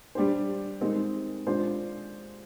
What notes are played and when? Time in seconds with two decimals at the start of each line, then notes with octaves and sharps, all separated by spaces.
0.15 G3 D4 G4 C5
0.81 G#3 C4 D#4 A#4
1.46 G#3 D4 F4 C5